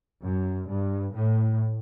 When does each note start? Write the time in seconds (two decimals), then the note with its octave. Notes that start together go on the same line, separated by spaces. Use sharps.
0.22 F#2
0.68 G2
1.14 A2